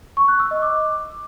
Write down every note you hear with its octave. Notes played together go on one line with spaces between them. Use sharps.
C#6
F#6
E6
D#5
D6